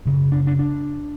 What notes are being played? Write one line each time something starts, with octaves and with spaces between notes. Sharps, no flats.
F#2 C#3
D4
D4
D4